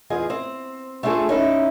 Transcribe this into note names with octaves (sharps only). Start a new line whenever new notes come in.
E2 F4 G#4 D#5
C4
A3 C4 D4 F4 G#4 A4
C#4 D#4 E4